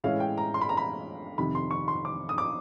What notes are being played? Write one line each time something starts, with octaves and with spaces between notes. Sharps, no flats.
A2 E3 G#3 C#4 E4 F5
G5
A#5
C6
B5
A#5
B5
F2 C3 D#3 B5
C6
C#6
C6
D6
D#6
D6